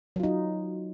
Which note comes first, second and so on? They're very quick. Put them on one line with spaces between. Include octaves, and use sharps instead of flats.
F#3 F4 D#4